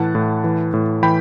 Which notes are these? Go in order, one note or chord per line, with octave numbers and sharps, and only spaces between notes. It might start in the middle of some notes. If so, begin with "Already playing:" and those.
Already playing: A2 E3 F#5 A5
A2
E3
A2
E3 G5 B5